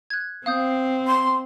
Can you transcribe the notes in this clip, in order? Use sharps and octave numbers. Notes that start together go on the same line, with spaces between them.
F#6 G#6
C4 F5 D#6 G6
C6